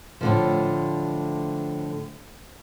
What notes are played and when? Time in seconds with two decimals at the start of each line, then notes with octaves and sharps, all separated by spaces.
0.21 A2 D3 F3